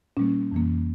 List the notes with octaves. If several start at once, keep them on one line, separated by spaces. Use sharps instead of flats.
A#2 G3 A#3 C#4
F2 E3 A#3